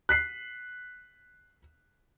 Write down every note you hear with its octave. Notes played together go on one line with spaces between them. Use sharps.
F#6 B6 C7